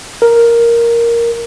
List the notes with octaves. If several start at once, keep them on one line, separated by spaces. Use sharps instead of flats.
A#4